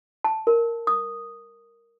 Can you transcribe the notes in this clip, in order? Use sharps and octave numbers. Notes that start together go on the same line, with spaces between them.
A5
A#4
D#6